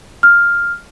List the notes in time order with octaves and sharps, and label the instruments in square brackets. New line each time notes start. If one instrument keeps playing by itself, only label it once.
[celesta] F6